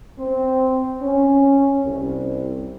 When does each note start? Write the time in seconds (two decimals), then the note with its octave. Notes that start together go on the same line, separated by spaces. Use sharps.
0.19 C4
1.02 C#4
1.84 C2